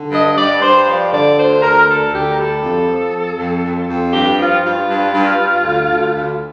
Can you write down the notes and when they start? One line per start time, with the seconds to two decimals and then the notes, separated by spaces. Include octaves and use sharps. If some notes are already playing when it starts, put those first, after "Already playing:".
Already playing: D3
0.11 G2 D#5
0.37 G2 D5
0.62 G2 C5
0.87 F3 D5
1.12 D3 D5
1.36 D2 C5
1.62 D2 A#4
1.87 D3 A4
2.12 D2 G4
2.32 A#4
2.37 G3 A4
2.62 F2
2.87 F3
3.13 F2
3.38 F2
3.63 F2
3.88 F2
4.13 G2 G4
4.38 F3 F4
4.63 G2 F4
4.88 G2
5.13 G2
5.39 G2
5.64 D2
5.89 D2
6.14 D2